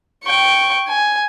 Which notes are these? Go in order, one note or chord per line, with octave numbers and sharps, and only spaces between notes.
G5 C#6
G#5